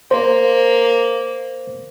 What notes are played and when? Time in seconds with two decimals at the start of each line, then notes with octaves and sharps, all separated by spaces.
0.11 A#3 C5